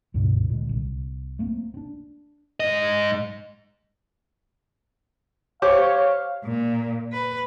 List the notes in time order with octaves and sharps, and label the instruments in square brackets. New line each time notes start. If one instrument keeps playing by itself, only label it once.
[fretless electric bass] C#2 G2 B2 D3
A#2 D3 G#3
C2
A3 A#3 C4
C4 D4
[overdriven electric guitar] G#2 D#5
[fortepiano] G4 C5 D6 [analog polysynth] C#5 [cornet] F5
[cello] A#2
B4